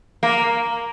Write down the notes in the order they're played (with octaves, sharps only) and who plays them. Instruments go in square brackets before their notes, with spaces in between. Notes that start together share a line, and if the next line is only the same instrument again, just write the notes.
[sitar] A#3